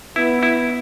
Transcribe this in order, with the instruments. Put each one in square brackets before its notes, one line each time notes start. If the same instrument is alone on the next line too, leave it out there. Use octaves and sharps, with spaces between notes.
[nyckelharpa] B3 [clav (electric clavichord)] E4
[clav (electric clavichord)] E4